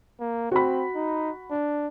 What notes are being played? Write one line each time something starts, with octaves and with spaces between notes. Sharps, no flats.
A#3
C4 F#4 B5
D#4
D4